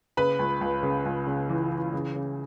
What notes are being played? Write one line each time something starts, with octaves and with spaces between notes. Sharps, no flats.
C#3 B4 B5
C#2
C#2
C#3
C#2
C#3
E3
E3
C#3
C#3